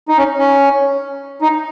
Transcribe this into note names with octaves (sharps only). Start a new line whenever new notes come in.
D#4
C#4
C#4
D#4